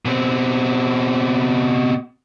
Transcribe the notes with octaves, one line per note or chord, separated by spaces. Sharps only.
B2 C4